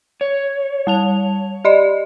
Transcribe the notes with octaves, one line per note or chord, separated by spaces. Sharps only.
C#5
G3 A5 F7
G4 D5 D#5